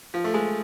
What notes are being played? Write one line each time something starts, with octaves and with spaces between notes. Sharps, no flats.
F3
A3
G#3